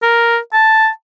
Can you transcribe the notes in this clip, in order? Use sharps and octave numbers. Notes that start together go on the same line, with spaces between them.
A#4
A5